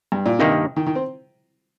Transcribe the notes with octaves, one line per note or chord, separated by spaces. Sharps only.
G2
A#2
G2 C3 D#3 A#3 D#4
D#3
D#3
C4